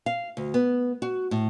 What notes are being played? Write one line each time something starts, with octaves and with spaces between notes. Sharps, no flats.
F5
D2
B3
F#4
A2